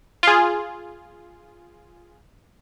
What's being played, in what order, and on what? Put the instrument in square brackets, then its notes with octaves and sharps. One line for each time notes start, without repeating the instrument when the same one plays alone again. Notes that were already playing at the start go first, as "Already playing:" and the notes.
[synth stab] F4 G#4